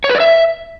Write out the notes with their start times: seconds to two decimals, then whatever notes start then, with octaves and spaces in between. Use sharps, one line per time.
0.04 C#5
0.10 B4
0.15 D5
0.20 E5